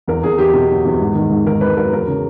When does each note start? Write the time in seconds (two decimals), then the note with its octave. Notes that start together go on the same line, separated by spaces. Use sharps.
0.08 E2 A#4
0.23 E2 G#4
0.38 E2 G4
0.53 B2
0.70 F#3
0.85 E2
1.00 G#2
1.15 D#3
1.30 G#2
1.46 D#3 A#4
1.61 G#2 B4
1.77 F#3 A#4
1.92 E2 A#4
2.07 C#3